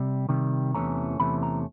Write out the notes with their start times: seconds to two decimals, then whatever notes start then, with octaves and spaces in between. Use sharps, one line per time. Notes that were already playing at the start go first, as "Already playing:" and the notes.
Already playing: C3 G3
0.29 C3 D#3 G3
0.74 E2 C3 E3 A3 C#4 A#5
1.19 E2 C3 E3 A3 C#4 B5
1.43 A#5